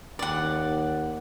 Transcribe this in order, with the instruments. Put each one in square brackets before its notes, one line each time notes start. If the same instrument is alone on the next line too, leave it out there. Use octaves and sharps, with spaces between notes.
[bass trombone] D#2 [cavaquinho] D5 F#5